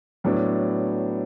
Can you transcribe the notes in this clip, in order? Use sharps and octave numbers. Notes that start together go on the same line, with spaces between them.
A2 F#3 B3 D4